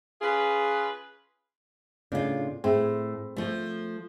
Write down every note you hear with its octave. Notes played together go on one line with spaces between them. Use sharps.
C#4 F4 G#4 B4
A2 C#3 D4 F4
A2 C4 G#4 E5
F3 A3